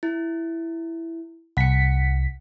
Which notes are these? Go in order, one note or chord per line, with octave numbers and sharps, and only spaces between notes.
E4
C2 F#5 B6 C#7